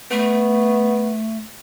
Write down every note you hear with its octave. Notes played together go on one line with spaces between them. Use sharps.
A3 B3